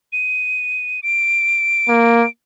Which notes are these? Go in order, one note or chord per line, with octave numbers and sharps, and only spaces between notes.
D#7
D7
A#3